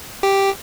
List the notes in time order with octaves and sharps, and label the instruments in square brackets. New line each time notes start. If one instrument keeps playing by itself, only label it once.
[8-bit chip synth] G4